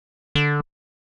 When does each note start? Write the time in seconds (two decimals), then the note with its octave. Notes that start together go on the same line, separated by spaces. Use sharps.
0.35 D3